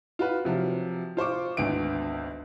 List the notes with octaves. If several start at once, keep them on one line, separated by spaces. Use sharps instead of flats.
F4 F#4 B4
C3 F3 F#3
F4 C5 C#6 D6
G#1 D2 B3 D7